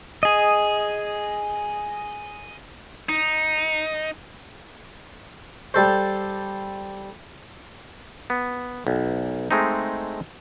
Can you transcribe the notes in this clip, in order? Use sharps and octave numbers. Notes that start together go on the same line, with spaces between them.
G#4 D#5
D#4
G3 A4 C5
B3
B1
G#3 A3 C4 D#4